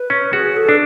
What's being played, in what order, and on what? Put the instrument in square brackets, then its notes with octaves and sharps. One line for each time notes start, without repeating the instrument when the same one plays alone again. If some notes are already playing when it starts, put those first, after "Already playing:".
Already playing: [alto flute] B4
[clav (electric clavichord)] C#4
[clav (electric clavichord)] F#4 [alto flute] G#4
[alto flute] A4
[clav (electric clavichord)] D4